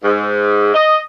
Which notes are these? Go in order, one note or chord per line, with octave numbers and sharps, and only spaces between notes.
G#2
D#5